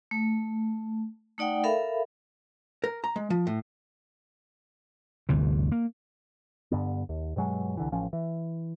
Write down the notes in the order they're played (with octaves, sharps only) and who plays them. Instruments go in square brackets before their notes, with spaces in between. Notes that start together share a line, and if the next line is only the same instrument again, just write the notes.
[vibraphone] A3
A3 D#4 D5 F#5 G5
A4 A#4 E5 F5 B5
[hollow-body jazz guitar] A#4
A#5
G#3
F3
A2
[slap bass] G1 D2 C3 E3
A#3
[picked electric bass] G2 D3 B3
D#2
G2 B2 F#3 G#3
C2 D3 E3
A1 F3 C#4
E3